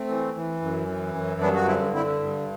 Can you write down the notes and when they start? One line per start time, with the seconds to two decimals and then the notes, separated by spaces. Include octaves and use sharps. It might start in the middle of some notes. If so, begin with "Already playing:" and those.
Already playing: A3 C4
0.08 E3
0.35 E3
0.61 F#2
0.88 E3
1.15 F#2
1.40 G2 B3 D4
1.55 F#4
1.67 D3 C4 E4
1.93 D3 C4 E4
2.21 G2